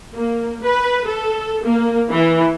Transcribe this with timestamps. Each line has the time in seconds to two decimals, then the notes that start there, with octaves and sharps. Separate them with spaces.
0.14 A#3
0.64 B4
1.07 A4
1.64 A#3
2.11 E3